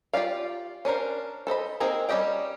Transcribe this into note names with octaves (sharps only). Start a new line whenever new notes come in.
F4 G4 D5 F5
C#4 D4 A#4 C5
A4 C5 D#5 B5
A#3 C4 D#4 G#4 A#4
G3 C#4 G4 D#5 G5